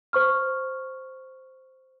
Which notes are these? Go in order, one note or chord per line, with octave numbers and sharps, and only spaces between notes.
C5 C#6 F6